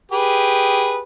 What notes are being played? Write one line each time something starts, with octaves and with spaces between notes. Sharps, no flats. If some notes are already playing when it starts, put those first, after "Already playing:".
G4 G#4 B4